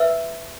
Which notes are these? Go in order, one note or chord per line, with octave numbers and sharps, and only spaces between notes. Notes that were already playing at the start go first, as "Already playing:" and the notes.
Already playing: B4 E5 E6